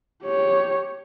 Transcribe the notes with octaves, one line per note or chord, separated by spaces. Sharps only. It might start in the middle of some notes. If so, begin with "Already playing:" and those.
G4 C#5